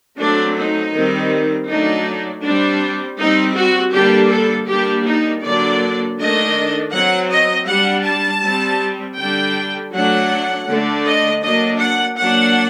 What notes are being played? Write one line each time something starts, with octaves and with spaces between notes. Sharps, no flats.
F#3 A3 C4 D4
D#4
D#3 G3 C4
F#3 A3 D4 D#4
G3 C4 D4
G3 C4 D#4
F#4
D3 G3 A#3 D4 G4
A4
G3 A#3 D4 G4
D#4
D3 F#3 A#3 D4 D5
D#3 A3 D4 D#5
F#3 C4 F#5
D#5
G3 D4 F#5
A5
G3 C4
D3 G3 D4 G5
F#3 A3 D4 F#5
D3 A3 D4
D#5
F#3 A#3 D4 D#5
F#5
F#3 A#3 D4 F#5